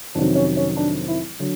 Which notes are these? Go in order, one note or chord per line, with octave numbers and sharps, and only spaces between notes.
F2 C3 D#3 F#3 D4
C#4
C#4
D4
E4
D3 F#3